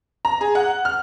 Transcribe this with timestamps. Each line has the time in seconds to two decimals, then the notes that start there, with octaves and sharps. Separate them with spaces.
0.25 A#5
0.41 G#4
0.55 F#5
0.85 F6